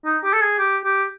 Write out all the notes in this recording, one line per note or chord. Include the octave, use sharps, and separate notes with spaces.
D#4
G4
A4
G#4
G4
G4